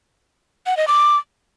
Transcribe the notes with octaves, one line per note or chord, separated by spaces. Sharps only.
F#5
D#5
D6